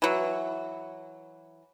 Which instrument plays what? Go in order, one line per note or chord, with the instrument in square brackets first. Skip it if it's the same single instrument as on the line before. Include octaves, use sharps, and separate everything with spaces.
[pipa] E3 F#3